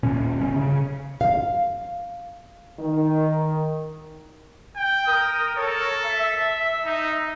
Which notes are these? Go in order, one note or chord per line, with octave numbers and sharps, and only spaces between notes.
D#1 A#2 C#4
G1 C#4
C#3
F5
D#3
G5
A#4 D#6
A4 A#4 C#5
E5
D#4